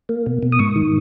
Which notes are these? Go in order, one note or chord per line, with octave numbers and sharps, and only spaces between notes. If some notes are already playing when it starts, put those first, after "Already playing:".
A#3
B2
B2
D#6
G#2 C#6
D#3